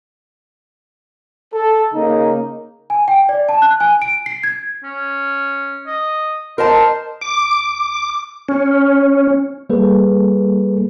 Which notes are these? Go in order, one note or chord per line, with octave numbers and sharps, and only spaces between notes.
A4
C#3 A#3 D#4
G#5
G5
D5
A5
F#6
G#5
D7
C7
G#6
C#4
D#5
A#4 C5 D#5 A5
D6
C#4
G3 A#3 G#4 A4 B4